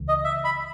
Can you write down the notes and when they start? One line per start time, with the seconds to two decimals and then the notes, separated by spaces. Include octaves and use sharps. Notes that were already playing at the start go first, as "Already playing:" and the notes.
Already playing: C#2 C#3 E3
0.09 D#5
0.24 E5
0.44 B5